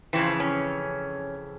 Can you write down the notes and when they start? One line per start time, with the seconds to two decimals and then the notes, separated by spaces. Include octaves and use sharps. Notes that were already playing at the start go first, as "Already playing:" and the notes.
0.13 F2 C#3 E3 C4
0.40 C#4